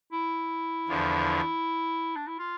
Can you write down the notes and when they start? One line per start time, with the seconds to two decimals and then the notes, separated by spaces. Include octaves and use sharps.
0.12 E4
0.88 E2 D3 F3
2.16 D4
2.27 E4
2.39 F4